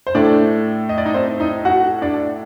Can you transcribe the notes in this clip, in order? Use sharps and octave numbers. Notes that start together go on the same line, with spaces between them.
C5
A2 A3 D4 D5
D#5
D5
D#4 D#5
C4 C5
D#4 D#5
F#4 F#5
D4 D5